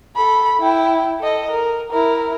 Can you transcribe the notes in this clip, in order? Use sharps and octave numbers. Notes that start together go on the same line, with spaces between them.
A4 B5
E4 G5
A4 D#5
A#4
E4 A#4